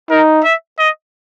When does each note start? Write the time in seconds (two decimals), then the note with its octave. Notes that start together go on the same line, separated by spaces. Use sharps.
0.10 D#4 A#4
0.44 E5
0.79 D#5